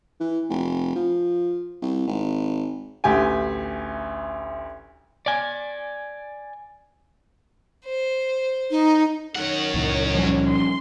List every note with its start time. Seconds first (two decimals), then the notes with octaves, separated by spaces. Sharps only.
0.20 E3
0.50 F1
0.96 F3
1.82 C2
2.07 G#1
3.04 A1 D2 G4 G#5
5.26 D5 G#5
7.85 C5
8.71 D#4
9.36 F#2 D#3 C#5 F#5
9.74 C#2 A#2 E3
10.15 F3 G3 C#4
10.50 C6